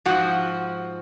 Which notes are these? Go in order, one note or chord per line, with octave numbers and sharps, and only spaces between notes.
G#2 F3 F#4